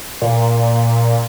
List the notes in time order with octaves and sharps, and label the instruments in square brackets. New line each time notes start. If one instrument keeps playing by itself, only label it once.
[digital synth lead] A#2